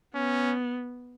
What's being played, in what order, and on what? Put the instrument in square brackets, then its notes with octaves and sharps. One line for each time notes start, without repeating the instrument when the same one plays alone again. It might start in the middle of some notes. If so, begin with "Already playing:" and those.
[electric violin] B3 [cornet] C#4